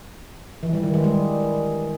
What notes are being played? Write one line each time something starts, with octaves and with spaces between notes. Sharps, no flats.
E3
G3
D#3
G#3
G3